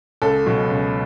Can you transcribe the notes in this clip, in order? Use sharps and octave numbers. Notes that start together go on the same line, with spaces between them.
C#2 A4
B2 F#3
C#2